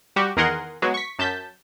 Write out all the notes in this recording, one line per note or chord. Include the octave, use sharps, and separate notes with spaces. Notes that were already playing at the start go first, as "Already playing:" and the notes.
G3 F#4 G4
E2 D#3 G#4 A#4 F#5 C6
F#3 G#3 B3 F#4
C#6 B6
F#2 A5 G6 B6